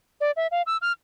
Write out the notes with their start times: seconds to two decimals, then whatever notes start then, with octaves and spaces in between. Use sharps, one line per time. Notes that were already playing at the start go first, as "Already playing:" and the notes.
0.21 D5
0.36 E5
0.51 F5
0.66 E6
0.82 F6